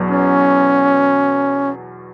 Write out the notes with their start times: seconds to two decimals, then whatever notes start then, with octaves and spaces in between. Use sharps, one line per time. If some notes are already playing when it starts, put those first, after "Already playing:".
Already playing: E2 B2 F#3
0.11 C#4